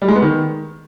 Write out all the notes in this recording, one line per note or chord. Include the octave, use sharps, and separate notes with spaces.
G3
G#3
B3
D#3